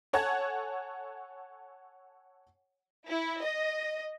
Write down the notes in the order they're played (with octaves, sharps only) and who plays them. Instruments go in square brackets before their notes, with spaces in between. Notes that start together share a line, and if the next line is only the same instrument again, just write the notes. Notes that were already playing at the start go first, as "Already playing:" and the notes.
[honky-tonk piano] A4 C#5 F#5 G#5 A5 G#6
[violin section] E4
D#5